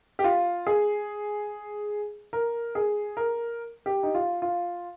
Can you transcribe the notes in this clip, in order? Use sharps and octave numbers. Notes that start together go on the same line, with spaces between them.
G4
F4
G#4
A#4
G#4
A#4
G4
D#4
F4
F4